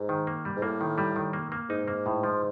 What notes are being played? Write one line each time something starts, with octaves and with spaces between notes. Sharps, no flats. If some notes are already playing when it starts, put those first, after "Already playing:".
Already playing: G#2
D#3
A#3
G3
G#2
A2 A#3
D#3
G3
D#3
A#3
A#3
G#2 D#4
A#3
A2
F3